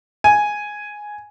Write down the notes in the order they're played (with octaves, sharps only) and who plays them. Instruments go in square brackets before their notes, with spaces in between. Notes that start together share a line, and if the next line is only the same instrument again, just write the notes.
[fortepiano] G#5